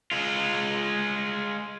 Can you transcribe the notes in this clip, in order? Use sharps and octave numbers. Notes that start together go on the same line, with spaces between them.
G#3 F4